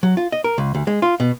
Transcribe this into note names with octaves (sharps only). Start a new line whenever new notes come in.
F#3
F4
D#5
A#4
C#2
D2
G#3
F4
B2